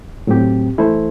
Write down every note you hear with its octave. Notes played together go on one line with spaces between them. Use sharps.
A2 F#3 C4 G4
E3 A3 E4 A4 C5